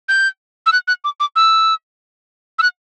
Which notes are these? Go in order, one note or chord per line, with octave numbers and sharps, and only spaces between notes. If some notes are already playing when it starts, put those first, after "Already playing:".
G6
E6
F#6
F#6
D6
D6
E6
E6
F#6